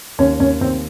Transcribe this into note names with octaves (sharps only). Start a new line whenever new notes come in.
D#2 C#4
D#2 C#4
D#2 C4